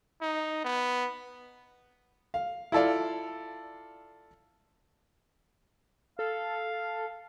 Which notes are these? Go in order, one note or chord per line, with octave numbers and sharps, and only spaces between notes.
D#4
B3
F5
E4 F4 A4 D5 F5
A4 F5